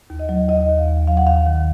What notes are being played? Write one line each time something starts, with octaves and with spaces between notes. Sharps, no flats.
D#2
D#5
F#3
D#2 D#5
D#2
F5
D#2
F#3 F5
F#5
D#2 F5
D#3